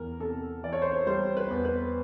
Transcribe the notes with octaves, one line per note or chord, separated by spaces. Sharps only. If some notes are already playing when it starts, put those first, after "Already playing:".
Already playing: E2 E3 A#4
C3 A4
E3 D5
C#5
C5
C#5
G3 C5
B4
E2
B4